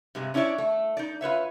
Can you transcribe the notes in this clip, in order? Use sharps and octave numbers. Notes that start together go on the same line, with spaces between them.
G2 C3 G#3
C#4 D4 E4 A4 C#5 D5
A3
D#4 D5
F4 B4 C#5 E5